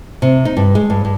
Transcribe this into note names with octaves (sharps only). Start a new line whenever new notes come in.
C3
D#4
G2
G#3
G2
G2